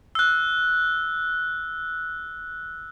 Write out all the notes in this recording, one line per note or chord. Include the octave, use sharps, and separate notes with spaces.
E6 F#6